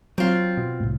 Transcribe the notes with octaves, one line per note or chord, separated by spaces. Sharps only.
F#3 C4 F4
B2
C2 A2